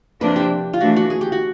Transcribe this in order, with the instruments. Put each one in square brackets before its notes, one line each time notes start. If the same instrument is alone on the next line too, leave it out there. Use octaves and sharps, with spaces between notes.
[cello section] C3 F3 A#3 D4 [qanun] B4
[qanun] G4
F4
[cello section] E3 A3 D4 [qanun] F#4
[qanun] F#4
G#4
G4
F#4